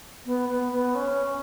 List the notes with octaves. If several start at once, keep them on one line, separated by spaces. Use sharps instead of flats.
B3
B3
B3
C#4